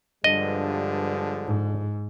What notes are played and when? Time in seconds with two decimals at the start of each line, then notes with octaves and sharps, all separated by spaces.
0.24 G2 D3 F3 G#3 D#5
1.46 G#2